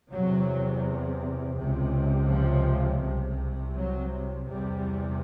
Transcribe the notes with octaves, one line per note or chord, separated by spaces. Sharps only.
E2 C3 F#3
C#2 C3
F3
C2 C3
F#3
E2 C3 G3